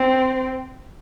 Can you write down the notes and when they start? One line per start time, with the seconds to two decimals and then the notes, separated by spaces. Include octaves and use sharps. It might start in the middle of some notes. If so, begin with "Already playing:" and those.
Already playing: C4